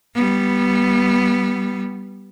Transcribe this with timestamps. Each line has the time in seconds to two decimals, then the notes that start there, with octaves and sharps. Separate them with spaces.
0.14 G3 B3